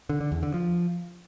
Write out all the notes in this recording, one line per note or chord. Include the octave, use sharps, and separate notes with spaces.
D3
D3
E2
D3
F3